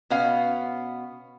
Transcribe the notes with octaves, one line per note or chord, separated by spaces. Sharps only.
B2 B3 C#4 F5